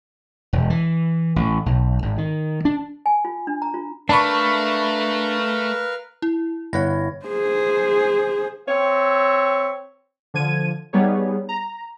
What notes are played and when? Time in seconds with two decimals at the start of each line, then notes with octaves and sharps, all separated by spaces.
0.53 E1
0.70 E3
1.36 A1
1.66 B1
2.02 G#1
2.18 D#3
2.65 D4
3.06 G#5
3.25 F4
3.47 D4
3.62 A#5
3.74 F4
4.09 A3 D4 A#4 B4 F5 A5 B5 C#6
6.22 E4
6.73 G1 E4 B4 C#5 F#5 A#6
7.26 G#4 C5
8.68 C4 C#5 E5
10.34 D3 F3 G#6 D#7
10.93 G3 B3 D#4 G#4 C#5
11.49 A#5